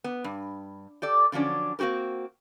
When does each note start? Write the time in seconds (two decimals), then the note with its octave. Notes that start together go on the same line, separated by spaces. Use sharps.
0.04 B3
0.24 G2
1.02 G4 A4 D5
1.32 D3 F3 F#3 C#4 D4
1.79 A#3 C4 F#4 G4 A#4